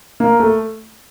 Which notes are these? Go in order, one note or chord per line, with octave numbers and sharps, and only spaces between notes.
A#3
A3